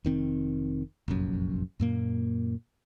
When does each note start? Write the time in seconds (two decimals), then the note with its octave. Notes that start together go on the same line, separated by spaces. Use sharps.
0.05 F1 D#3 C4
1.08 F1 A#1 F#2
1.80 F#2 A#2 A#3